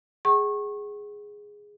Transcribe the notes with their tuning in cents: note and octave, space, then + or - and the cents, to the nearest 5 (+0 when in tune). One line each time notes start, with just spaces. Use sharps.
G#4 +0 F#5 +45 C#6 -25